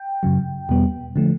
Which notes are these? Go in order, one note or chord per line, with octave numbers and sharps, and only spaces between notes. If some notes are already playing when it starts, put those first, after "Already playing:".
Already playing: G5
F#2 C#3 F#3
E2 B2 G3 B3
D3 F3 A3